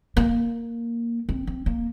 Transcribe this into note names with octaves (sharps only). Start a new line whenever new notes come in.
A#3
C4
C4
A#3